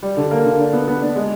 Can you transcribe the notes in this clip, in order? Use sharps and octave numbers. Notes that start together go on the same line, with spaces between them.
G3
D3
A#3
D3
D4
B3
B3
D4
G#3